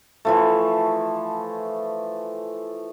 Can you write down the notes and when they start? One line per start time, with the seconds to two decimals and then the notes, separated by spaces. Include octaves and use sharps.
0.25 E3 F3 A3